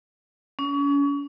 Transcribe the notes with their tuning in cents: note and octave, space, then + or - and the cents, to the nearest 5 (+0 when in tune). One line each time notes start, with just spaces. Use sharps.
C#4 +35